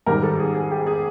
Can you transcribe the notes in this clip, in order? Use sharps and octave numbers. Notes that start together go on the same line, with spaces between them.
G#2 D#3 G3 A#4
A4
G#4
G#4
G4
G#4